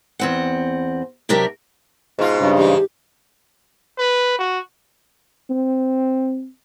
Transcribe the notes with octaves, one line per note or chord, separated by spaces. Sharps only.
E2 C4 F#5
C3 F#3 D4 G4 A#4 E5
G#2 B2 F4
G2 C#3
E3 D#4 G4
B4
F#4
C4